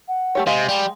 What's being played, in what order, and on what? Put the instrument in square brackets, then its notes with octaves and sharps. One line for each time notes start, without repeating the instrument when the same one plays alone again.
[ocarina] F#5
[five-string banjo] A3 G4 C#5
[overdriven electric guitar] C3 [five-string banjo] G#3 F5 [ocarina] D#5
[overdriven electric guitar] G3 [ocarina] G5